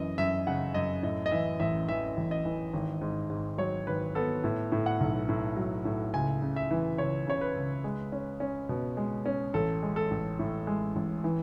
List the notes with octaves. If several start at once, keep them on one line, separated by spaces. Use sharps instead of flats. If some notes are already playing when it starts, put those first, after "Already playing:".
Already playing: F#2 E3 D#5
F#2 E5
C#3 F#5
F#2 D#5
A2 D#5
D#5
E3 E5
A1 E5
E3 E5
A1
D#5
E3
G#1
G#2
G#2
F#3 C#5
G#1 B4
B3 A4
A2
A2
F#5
B1
A2
F#3
A2
C#2 G#5
C#3
E5
E3
C#2 C#5
C#3 C#5
B4
C#2
G#3
C#4
C#4
B2
G#3
C#4
A1 A4
G#3
A4
A1
A2
G#3
A1
E3